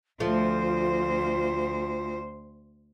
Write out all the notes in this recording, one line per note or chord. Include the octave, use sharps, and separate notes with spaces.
D2 F3 A3 F4 C5